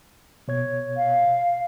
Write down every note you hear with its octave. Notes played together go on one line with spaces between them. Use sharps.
B2 C#5 G#6
F5